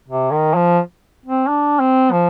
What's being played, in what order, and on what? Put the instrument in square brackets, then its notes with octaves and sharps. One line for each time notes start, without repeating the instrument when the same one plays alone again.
[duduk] C3
D#3
F3
C4
D4
C4
F3